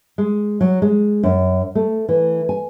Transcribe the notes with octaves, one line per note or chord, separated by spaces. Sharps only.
G#3
F#3
G#3
F#2
A3
E3
G#5